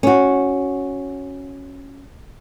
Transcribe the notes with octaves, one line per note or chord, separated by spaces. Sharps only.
C#4 F#4